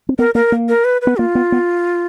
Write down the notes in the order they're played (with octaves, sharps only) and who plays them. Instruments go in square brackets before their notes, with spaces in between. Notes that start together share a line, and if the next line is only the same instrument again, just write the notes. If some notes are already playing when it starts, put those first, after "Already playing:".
[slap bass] C4
[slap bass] B3 [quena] A#4
[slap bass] A#3 [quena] A#4
[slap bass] A#3
[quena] A#4
B4
B4
[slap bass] B3
[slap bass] A#3 [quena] F4
[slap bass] B3
B3